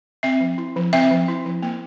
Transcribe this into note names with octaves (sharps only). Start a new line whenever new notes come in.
C4 E5
F3
E4
F3
C4 E5
F3
E4
F3
A#3